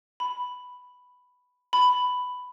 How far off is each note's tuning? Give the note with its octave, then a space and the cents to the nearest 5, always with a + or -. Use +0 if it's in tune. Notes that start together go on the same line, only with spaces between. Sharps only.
B5 +5
B5 +10